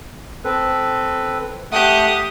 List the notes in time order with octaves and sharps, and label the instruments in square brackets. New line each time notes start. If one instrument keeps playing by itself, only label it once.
[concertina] C4 A4 B4
[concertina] A3 F#5 F#6 [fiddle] G4 D#6